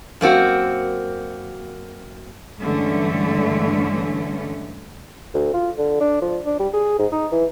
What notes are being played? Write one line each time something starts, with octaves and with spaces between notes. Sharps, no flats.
F#2 A#3 C4 F#4
G2 D3 E3 G#3 A3 C#4
D2
F4
D3
D4
F3
D4
G3
G#4
G#2
D#4
E3